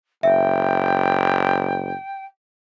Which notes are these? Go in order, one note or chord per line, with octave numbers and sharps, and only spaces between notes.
F#1 E5 G5